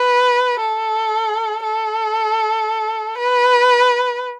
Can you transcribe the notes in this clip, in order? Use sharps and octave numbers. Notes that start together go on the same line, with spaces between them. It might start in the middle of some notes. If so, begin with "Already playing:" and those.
Already playing: B4
A4
A4
B4